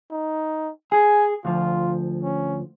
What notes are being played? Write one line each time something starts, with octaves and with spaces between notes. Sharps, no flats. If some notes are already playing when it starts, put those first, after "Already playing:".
D#4
G#4 G#5
D2 F3 F4
C#4